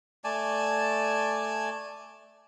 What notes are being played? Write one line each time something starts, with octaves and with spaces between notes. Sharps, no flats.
A3 D5 G#5 A5